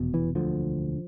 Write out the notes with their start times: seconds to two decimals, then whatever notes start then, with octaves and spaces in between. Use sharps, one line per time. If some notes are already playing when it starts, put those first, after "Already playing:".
Already playing: F1 E2 B2
0.14 E3
0.35 E1 D2 D3 F3